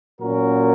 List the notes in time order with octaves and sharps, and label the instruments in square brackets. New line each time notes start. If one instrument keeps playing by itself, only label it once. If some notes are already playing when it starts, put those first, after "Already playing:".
[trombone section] A#2 F#3 C#4 F#4 A#4